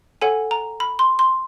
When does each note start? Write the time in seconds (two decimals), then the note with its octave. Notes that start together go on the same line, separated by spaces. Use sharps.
0.21 A4 C#5 F#5 G#5
0.51 A#5
0.80 B5
0.99 C6
1.19 C6